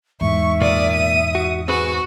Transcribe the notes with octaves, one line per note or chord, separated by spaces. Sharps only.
E2 G#2 E5 C#6
A#2 A#3 D5 D#6
D#6 D#7
F#4
C4 F#4 G#4 B4 G#5